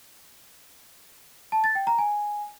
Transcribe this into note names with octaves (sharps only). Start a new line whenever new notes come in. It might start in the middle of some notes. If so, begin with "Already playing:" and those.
A5
A6
G5
A#5
G#5